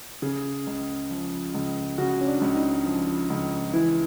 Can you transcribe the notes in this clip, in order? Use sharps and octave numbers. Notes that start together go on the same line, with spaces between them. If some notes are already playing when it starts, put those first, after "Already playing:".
C#3 G#4
C#2
F3
C#2
C#3 F#4
C#4
D4
C#2
D#4
F3
C#2
E3 E4